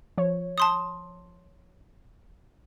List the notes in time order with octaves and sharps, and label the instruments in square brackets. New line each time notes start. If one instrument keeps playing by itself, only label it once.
[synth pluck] F3 C#5
[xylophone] A5 C6 D#6